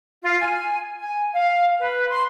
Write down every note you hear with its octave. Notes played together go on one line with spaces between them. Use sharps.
F4
G#5
G#5
F5
B4
C6